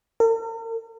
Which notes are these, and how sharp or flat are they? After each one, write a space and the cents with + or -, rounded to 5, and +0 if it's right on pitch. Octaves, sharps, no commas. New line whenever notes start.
A#4 -45